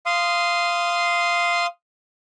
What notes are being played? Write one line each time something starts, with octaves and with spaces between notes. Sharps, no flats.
F5 C6 D#6